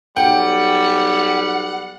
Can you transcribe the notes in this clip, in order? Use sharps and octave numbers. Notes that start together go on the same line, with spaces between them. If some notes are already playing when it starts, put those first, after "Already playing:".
B1 G3 F#5 G5